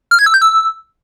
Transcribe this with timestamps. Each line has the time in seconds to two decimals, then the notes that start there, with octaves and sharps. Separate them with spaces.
0.11 F6
0.19 G#6
0.26 E6
0.34 G6
0.42 E6